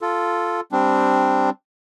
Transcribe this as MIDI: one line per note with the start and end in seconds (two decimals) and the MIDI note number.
0.01 0.61 65
0.01 0.61 69
0.72 1.50 55
0.72 1.50 60
0.72 1.50 62